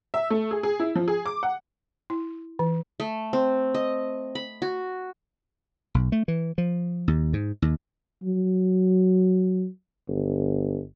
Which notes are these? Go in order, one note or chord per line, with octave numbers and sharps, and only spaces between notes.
E5
A3
G#4
G#4
E4
F3
G#4
D6
F#5
E4
E3
A3
C4
D#5
B5
F#4
B1
A3
E3
F3
D#2
G#2
D#2
F#3
G1